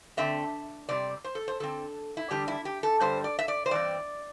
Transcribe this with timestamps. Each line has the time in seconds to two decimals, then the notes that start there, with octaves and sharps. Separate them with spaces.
0.17 D3 A3 C4 E5
0.89 C3 G3 C4 D5
1.24 C5
1.35 A4
1.48 C5
1.60 D3 C4 A4
2.17 E4
2.30 E2 D3 G3 D4 G4
2.48 E4
2.65 G4
2.83 A4
3.00 G2 D3 G3 C5
3.24 D5
3.39 E5
3.48 D5
3.66 C5
3.71 G2 E3 C4 D5